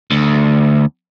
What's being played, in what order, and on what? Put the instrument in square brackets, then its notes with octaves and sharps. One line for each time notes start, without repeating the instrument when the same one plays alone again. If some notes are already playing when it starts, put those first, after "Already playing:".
[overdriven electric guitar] D2